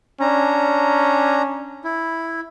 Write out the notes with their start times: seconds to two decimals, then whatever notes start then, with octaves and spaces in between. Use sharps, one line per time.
0.21 C#4 D4 A#5
1.84 E4